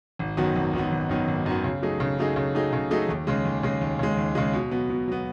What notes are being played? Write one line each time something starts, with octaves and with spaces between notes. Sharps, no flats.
G#1
F#2 D#3 F#3 B3
G#1
F#2 D#3 F#3 B3
G#1
F#2 D#3 F#3 B3
G#1
F#2 D#3 F#3 B3
C#3
F#3 A3 D#4 G#4
C#3
F#3 A3 D#4 G#4
C#3
F#3 A3 D#4 G#4
C#3
F#3 A3 D#4 G#4
D#2
C#3 G#3
D#2
C#3 G#3
D#2
C#3 G#3
D#2
C#3 G#3
B2
F#3 B3
B2
F#3 B3